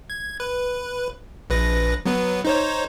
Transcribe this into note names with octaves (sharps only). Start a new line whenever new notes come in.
G#6
B4
A#1 B4 A#6
F#3 B3 B4
D#4 C5 C#5